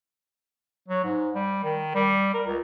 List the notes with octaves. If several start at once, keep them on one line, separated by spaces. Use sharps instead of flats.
F#3
G#2
G3
D#3
G3
A#4
C#2